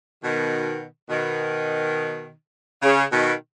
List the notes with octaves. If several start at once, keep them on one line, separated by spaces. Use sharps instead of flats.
B2 D#3
B2 D#3
C#3
B2 D#3